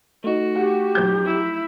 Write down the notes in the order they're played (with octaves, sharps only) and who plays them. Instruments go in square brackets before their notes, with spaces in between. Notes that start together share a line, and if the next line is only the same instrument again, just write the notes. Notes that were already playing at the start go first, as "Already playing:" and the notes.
[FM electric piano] A3 D#4 [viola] F#4
[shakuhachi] G4 [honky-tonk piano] F#5
[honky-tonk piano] F2 F#3 G6
[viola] E4